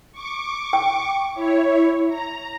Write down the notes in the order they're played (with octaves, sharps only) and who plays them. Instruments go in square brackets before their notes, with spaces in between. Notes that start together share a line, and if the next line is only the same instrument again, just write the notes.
[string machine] C#6 D6
[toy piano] G5
[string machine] E4 C#5
A#5